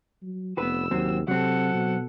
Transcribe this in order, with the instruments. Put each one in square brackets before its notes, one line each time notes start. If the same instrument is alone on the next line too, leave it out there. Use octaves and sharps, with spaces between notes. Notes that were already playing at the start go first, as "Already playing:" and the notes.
[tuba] F#3
[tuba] F1 [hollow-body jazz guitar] B3 B4 [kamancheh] E6
[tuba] D#2 [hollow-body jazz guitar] C3 F#3 C4
[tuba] C3 [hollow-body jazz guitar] F#3 C4 [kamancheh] A4 F#5
[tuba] B2